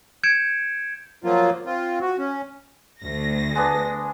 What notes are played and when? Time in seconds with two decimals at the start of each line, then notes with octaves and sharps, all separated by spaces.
0.24 G6 G#6 C#7 D7 E7
1.24 F3 F#3 A#3 F4
1.65 C4 F4
2.01 F#4
2.18 C#4
3.02 D2 A#6
3.55 G#3 B3 D4